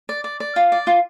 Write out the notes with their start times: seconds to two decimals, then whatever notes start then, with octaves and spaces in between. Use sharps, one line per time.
0.09 D5
0.24 D5
0.40 D5
0.56 F4
0.72 D5
0.87 F4